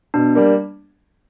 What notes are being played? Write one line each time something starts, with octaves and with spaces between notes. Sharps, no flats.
B2 D4
G3 A#3